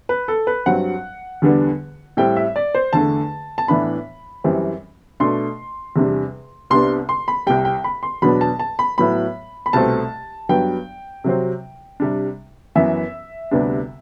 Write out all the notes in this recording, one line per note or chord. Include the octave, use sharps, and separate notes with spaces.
B4
A4
B4
G2 F#3 C4 F#5
E2 D3 G3 B3 D4
A2 G3 C4 G5
E5
D5
C5
E2 D3 A3 A5
A5
A2 E3 B3 D4 B5
F#2 E3 G3 C4
B2 A3 D4 C6
E2 C3 G3 D4
C2 C3 G3 B3 D4 C6
C6
B5
C2 C3 G3 G5
G5
B5
C6
E2 B2 F#3 B3 D4 B5
A5
A5
B5
A2 F#3 B3 B5
B5
C2 B2 A3 C4 A5
G2 F#3 B3 G5
C3 F#3 C4
C3 G3 D4
F#2 E3 B3 E5
D2 C3 G3 B3 D4